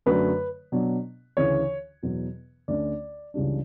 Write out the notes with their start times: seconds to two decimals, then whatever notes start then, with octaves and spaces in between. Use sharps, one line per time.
0.06 F#2 D3 F#3 A3 B4
0.72 B2 F#3 B3 D4
1.37 D2 C#3 E3 C#5
2.03 E2 B2 F#3 B3
2.68 D2 D3 A3 C#4 D5
3.34 C#2 C#3 E3 G3 D4